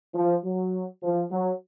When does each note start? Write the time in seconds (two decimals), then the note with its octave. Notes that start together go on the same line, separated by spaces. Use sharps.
0.14 F3
0.44 F#3
1.02 F3
1.31 F#3